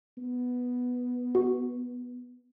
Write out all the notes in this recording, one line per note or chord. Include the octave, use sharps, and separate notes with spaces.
B3
F#4